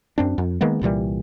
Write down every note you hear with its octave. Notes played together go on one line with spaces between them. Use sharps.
F#2 C4 D4
F2
D#3 G#3 A#3 B3
C2 A#2 E3 G3